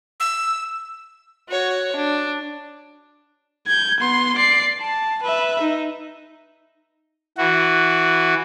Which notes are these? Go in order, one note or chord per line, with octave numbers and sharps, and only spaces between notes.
E6
F#4 C#5
D4
G6 G#6
B3 C6
D5 C7
A5
B4 E5
D#4
E3 F#4